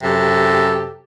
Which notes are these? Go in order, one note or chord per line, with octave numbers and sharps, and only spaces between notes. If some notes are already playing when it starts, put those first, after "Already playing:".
F#2 C3 G4 A4